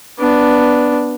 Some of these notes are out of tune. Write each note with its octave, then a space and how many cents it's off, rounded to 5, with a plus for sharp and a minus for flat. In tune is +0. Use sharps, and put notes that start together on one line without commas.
B3 +0 D4 +0